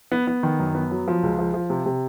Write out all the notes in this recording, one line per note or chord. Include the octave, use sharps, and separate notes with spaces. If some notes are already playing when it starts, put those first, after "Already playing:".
B3
B3
D#3
F#2
B3
F#3
F3
C#2
F3
F3
C3
C3